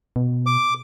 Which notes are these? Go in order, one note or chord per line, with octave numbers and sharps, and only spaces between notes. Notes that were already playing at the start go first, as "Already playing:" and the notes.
B2
D6